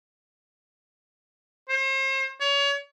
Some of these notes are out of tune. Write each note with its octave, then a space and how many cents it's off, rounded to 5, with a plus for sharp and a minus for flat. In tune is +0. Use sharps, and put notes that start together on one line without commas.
C5 +40
C#5 +30